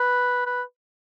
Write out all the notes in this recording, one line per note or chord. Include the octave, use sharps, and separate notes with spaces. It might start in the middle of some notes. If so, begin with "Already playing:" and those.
Already playing: B4
B4